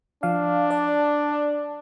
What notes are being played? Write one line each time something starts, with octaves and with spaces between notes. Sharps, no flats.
F3 D4 F5
D5 A5